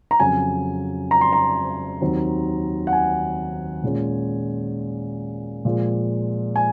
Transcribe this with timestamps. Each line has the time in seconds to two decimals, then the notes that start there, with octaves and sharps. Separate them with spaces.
0.11 A#5
0.20 F2 C#3 F#3 G#5
1.11 A#5
1.21 C6
1.33 A#5
2.01 D#2 D#3 F#3 C4 D#4
2.87 F#5
2.93 G#5
3.84 A#2 G#3 C#4
5.65 A#2 F3 G#3
6.56 G#5